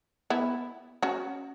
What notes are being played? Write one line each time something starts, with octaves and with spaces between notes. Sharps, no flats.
B3 E4
C#4 F#4